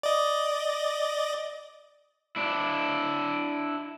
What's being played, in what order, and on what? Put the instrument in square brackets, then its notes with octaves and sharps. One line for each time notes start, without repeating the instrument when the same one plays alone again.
[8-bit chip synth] D5 D#5
[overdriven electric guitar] D4 E4